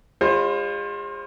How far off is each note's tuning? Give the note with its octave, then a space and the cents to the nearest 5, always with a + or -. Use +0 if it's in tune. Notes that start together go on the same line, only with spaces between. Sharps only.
G#3 -40 F4 +10 C5 +35